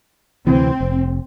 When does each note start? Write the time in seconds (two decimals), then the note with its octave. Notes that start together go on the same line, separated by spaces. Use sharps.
0.47 D2 C3 E3 C4
0.80 F1